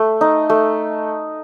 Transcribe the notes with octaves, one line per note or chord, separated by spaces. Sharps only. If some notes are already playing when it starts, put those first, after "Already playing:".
Already playing: A3
D#4
A3